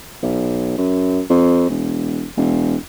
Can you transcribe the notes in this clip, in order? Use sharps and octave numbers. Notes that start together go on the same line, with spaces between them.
B1
F#2
F2
E1
E1